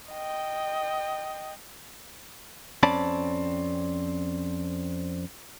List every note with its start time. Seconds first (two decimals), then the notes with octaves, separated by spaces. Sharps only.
0.12 D#5 G5
2.83 F2 C4 C#4 D5 A5 B5